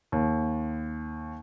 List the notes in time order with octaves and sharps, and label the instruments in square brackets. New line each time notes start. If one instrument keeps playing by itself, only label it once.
[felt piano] D#2